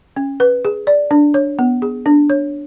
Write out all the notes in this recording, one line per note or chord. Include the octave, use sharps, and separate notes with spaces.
C#4
B4
G#4
D5
D4
C#5
B3
G#4
D4
C#5